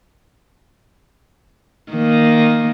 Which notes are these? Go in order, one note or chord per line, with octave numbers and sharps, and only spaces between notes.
D#3 A#3